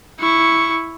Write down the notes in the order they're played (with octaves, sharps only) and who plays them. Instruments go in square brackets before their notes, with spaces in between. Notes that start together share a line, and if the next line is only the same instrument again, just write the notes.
[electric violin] E4 C#6